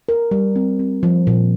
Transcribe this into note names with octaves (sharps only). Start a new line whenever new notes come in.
A#4
G3
C4
C4
F3
A#2